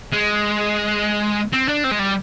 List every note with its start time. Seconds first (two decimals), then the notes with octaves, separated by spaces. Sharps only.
0.12 G#3
1.53 C4
1.68 D4
1.84 C4
1.91 G#3
1.99 G3